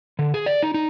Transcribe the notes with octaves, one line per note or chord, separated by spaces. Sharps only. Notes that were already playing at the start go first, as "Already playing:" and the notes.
D3
G#4
D5
D#4
D#4